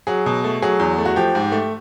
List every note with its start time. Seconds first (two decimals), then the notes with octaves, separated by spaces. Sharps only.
0.07 F#3 G#4
0.26 B2
0.44 A3
0.62 F#3 G#4
0.80 E2
0.99 A3
1.05 F#4
1.16 F3 G4
1.35 G#2
1.52 A3